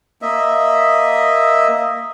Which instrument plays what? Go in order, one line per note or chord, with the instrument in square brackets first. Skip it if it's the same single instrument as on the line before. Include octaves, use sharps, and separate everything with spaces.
[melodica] A#3 D#5 E5